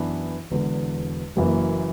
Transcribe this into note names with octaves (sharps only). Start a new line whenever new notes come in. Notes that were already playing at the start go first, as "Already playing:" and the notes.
Already playing: F#2 E3 B3 D4
E1 E2 D3
F#1 F#2 E3 A#3